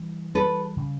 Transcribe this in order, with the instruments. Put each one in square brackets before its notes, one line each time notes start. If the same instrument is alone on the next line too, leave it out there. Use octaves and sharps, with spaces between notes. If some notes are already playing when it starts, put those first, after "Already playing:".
Already playing: [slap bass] E3 G3
[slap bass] G3 [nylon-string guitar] A4 B4
[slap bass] C#3